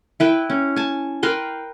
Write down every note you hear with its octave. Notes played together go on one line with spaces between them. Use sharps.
E4 B4 G5
C#4
G#5 A5
A#4 B4 G5 C6